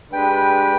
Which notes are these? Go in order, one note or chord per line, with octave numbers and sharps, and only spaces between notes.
G#3 D4 G4 B4 G5